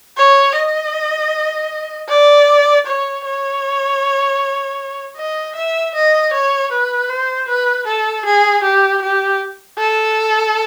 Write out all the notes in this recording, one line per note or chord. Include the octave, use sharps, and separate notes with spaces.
C#5
D#5
D5
C#5
C#5
D#5
E5
D#5
C#5
B4
C5
B4
A4
G#4
G4
G4
A4